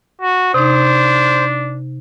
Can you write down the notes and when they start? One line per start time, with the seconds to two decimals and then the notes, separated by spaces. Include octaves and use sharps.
0.21 F#4
0.54 C3 D4 D#4 C5